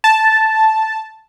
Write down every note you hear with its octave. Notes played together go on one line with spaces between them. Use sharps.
A5